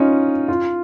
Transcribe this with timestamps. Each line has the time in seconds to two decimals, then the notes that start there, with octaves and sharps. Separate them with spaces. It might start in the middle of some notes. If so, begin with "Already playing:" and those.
Already playing: C#4 D#4 F4
0.48 F4